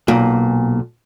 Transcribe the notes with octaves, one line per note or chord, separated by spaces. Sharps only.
B1 A#2